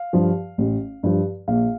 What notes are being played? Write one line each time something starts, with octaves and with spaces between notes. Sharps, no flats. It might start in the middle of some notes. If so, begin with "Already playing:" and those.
Already playing: F5
G2 F3
A1
G2 F3
A#1 F5